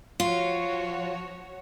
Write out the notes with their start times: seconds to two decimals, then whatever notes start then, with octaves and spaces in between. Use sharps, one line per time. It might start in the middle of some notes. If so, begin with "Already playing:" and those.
0.20 F3 F4 F#4 C#5